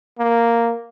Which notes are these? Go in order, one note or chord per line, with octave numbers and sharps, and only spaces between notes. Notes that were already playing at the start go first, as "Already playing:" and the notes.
A#3